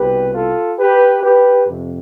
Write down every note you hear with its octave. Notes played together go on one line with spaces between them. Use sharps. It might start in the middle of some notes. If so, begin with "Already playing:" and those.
Already playing: C2 B2 G4 B4
F4 A4
G4 B4
G4 B4
F2 C3